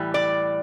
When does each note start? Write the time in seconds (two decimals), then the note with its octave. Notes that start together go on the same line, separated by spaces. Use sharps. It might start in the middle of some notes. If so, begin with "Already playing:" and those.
Already playing: A2 E3 G3
0.14 D5